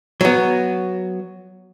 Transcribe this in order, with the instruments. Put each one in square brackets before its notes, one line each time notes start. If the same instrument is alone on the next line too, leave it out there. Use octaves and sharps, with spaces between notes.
[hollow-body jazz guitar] F#3 B3